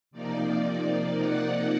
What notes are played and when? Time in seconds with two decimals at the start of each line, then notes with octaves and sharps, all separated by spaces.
0.11 C3 F3 A#3 D#4 D5
0.46 D5
1.18 F#5